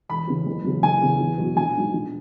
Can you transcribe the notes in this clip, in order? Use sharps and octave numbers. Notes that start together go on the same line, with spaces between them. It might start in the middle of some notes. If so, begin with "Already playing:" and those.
E1 B5
E2 C#3
F#1
E2 C#3 F#3
F#1 G#5
E2 C#3
E2
B2 F#3
A#1 G#5
G#2 F#3
A#1